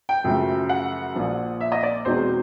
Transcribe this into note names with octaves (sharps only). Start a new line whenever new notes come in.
G5
F#2 C#3 F3 A3
F#5
A#1 A#2 F3
E5
D#5
D5
E2 B2 G#3 C4 D#4 C5